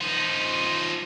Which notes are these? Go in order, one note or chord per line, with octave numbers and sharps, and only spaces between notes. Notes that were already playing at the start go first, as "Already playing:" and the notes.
F3 D#4